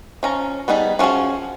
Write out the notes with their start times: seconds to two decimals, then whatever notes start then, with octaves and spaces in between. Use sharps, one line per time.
0.23 F3 C#4 A#5
0.68 G3 B3 D#4 G#4
0.99 F3 C#4 F4 F#4 G#4